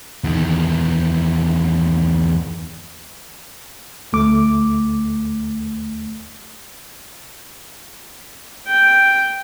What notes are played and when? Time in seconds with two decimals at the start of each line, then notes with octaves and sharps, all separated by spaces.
0.24 E2 D#3
4.13 D2 A3 D6
8.67 G5